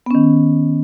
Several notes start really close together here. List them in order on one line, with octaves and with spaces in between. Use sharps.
B3 C#4 D#3